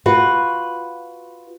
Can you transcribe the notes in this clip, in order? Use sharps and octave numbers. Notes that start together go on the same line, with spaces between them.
F4 F#4 B4